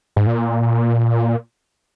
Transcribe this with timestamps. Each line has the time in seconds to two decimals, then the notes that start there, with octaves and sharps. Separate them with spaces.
0.16 G#2
0.27 A#2